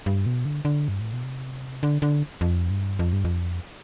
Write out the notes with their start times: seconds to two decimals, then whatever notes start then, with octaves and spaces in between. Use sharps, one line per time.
0.06 G2
0.26 B2
0.45 D3
0.65 D3
0.88 G2
1.00 A2
1.13 B2
1.24 C3
1.83 D3
2.02 D3
2.41 F2
2.70 G2
2.99 F2
3.13 G2
3.25 F2